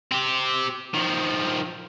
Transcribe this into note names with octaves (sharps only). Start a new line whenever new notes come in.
C4 G4
D#3 F3